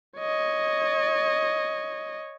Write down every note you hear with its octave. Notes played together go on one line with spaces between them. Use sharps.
C#5 D#5